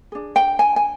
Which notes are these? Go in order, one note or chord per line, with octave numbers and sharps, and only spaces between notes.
D4 G#4
G5
G#5
G#5